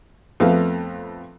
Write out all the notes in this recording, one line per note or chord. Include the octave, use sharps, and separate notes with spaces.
F2 A3 B3 F5